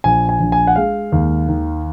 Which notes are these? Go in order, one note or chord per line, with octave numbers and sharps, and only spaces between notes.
A#1 G#5
G#5
A#1
G#5
F#5
G#3 F5
D#2
D#3